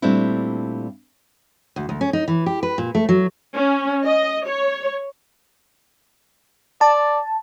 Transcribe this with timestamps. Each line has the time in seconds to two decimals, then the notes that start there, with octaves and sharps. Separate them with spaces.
0.02 A#2 G3 A3 C4 D4 E4
1.76 D2
1.89 D2
2.01 C#4
2.13 D#4
2.28 E3
2.46 G4
2.63 B4
2.78 A#2
2.95 A3
3.09 F#3
3.56 C#4
4.05 D#5
4.47 C#5
6.81 D5 A5